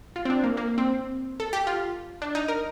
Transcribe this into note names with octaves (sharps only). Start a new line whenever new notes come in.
F4
C4
D4
A#3
A#3
C4
A4
G4
F4
D4
D#4
A#4